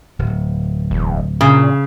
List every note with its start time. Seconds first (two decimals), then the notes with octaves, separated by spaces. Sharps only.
0.19 D1
0.91 E1
1.41 A#2 C#3